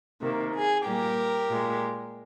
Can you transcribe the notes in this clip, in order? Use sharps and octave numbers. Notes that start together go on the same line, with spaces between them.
C3 D#3 A#3
G#4
A#2 G3 A#3 G4 A#4
A#2 G#3